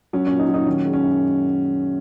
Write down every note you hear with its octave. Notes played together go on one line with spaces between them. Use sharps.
F#3 C#4
A#2 C#4
D#4
F#3
D#4
D#3 C#4
G#3
C#4
F#2